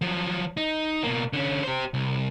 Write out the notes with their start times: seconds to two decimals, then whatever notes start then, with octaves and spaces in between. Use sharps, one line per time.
0.01 F3 F#3
0.57 D#4
1.04 B2 A#3
1.33 D3 C#4
1.63 G4 C5
1.94 C2